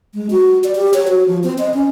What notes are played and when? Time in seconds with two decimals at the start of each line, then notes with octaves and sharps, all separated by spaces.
0.14 G#3
0.30 F#4
0.64 D5
0.75 G4
0.94 C#5
1.08 F#4
1.28 F3
1.44 C4
1.59 D#5
1.74 C#4